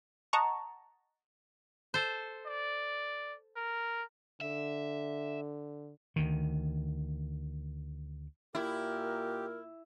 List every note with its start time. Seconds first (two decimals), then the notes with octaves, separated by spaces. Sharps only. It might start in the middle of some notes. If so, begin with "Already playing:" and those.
0.33 D#5 F#5 A5 A#5 C#6
1.94 A4 C5
2.46 D5
3.56 A#4
4.41 D3 E5
6.16 D2 D#3
8.55 A#2 E4 G4 A#4